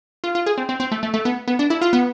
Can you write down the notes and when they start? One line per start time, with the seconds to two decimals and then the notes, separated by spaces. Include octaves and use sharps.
0.24 F4
0.35 F4
0.46 G#4
0.58 C4
0.69 C4
0.80 C4
0.92 A3
1.03 A3
1.14 A3
1.25 B3
1.48 B3
1.59 D4
1.70 E4
1.81 F4
1.93 B3